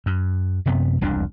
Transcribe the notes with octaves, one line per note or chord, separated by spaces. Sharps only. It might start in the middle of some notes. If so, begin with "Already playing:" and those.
F#2
F#2 C3 B3
E1 C2 F2 D4